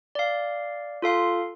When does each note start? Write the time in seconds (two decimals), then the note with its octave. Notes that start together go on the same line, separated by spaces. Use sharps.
0.15 D5 F5
1.02 F4 A4 F5 C6